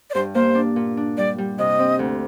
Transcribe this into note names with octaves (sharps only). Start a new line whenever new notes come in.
D5
G2 C5
A#3 C5
D4
A#2
D4
G3 D5
G3
C3 D#5
C4
D2